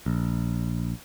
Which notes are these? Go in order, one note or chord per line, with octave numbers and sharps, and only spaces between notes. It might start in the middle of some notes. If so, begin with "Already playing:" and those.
A#1